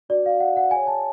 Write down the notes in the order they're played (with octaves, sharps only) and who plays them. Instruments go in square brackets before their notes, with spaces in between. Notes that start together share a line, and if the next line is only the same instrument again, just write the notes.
[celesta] D4 F#4 B4 D5
F5
F#5
F#5
G#4 C#5 G#5
A5